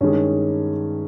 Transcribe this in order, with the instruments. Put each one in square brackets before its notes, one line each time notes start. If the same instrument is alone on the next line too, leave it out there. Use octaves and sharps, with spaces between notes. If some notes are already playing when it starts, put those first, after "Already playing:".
[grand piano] G2 D#3 G#3 C#4